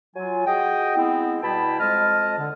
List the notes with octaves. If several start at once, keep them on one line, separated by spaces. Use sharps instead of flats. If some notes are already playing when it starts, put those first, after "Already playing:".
F#3 F4 G#5
F#4 G#4 D#5 G5
G#3 B3 C4 E4
B2 G3 E4 G5 A5 B5
F2 G#3 D#5 A5 F6
D3